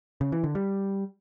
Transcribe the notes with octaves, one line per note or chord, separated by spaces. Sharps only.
C#3
E3
D3
G3